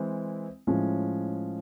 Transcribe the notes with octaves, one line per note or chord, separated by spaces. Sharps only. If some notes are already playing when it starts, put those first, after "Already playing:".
Already playing: E3 G#3 C4 E4
A2 F3 G#3 C#4